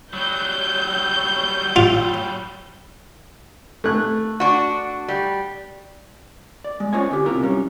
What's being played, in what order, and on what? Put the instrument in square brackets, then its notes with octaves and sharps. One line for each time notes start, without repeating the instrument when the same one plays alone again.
[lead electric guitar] F#3 G3 [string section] G6
[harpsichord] F4
[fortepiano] A3 F#6
[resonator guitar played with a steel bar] D4 F#4
G3
[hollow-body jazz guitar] D5
G#3
C#4 F4 C5 C#5 D#5 G#5
D3 C#4 G4
C3 E4 F4 A#4
F#2 G3 C#4